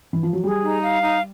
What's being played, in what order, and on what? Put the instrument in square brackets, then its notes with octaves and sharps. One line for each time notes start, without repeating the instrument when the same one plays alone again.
[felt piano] E3
F3
F#3
[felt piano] G3 [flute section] G#4
[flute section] D#4
F5
D#4